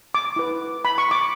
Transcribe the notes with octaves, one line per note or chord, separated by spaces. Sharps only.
D6
E4 B4
B5
C#6
D6